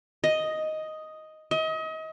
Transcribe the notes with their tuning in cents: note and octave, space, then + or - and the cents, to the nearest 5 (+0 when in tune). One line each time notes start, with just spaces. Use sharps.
D#5 +5
D#5 +35